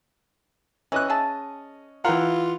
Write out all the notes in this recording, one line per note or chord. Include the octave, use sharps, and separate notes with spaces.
E3 C#4 D#5 F#6
G#4 E5 A5
E3 F4 A#4 F#5 G5